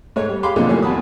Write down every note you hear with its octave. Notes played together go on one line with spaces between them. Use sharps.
G#2 A3 C#5
G3
G4 G#4 F5 B5 C6 D6
B1 F2 A#2 D3 F3 A#3
A2 E3 A3 A#3 C#4 G4
E2 F#4 A5 B5 D#6